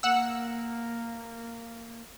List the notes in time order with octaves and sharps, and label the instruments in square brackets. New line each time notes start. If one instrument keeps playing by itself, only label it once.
[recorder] A#3 [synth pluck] F#5 E6